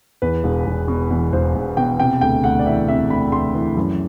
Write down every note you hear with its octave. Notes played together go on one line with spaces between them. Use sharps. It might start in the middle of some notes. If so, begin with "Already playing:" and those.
E2 B4
E1
E1
B2
E2
E1 C5
E1
B2 G5
C3 G5
D2 G5
D2 F#5
D5
E3 E5
C3 E5
D2 B5
D2 C6
E3
F#2